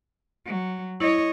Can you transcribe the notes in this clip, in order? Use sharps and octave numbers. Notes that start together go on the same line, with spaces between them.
F#3
E4 C#5 D#5